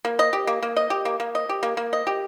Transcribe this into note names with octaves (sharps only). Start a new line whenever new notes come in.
A#3
D#5
G4
A#3
A#3
D#5
G4
A#3
A#3
D#5
G4
A#3
A#3
D#5
G4